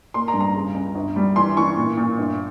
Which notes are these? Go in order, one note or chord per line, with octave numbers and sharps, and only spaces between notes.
A#3 C6
A#5
G2
A#5
C#3
C#2
G1
G3
E3 C6
E3 C#6
A#2
A#2
G1